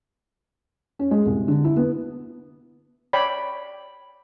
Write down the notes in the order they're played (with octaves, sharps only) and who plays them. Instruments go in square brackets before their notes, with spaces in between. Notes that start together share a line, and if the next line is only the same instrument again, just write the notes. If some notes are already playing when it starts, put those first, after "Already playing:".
[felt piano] C#4
G#3
C2
D3
E4
B3
[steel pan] C#5 D5 G5 B5